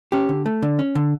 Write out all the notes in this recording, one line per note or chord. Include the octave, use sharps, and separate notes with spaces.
C#4 G4
D3
A3
D3
C#4
D3